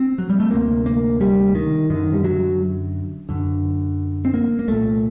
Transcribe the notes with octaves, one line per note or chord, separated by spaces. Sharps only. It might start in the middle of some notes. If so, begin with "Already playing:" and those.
Already playing: C4
F#3
G3
A3
D2 C3 A#3
A#3
G3
D#3
F#2 D3 D#3
G3
F#3
F#2 D3
C4
A#3
A#3
C2 A#2 A3